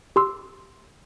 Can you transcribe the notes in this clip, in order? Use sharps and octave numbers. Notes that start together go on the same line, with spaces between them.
G4 C6 E6